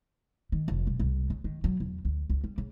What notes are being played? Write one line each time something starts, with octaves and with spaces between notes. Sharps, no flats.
D#3
F1
B1
C2
C#3
D#3
F#3
E2
D2
C#2
G3
C#3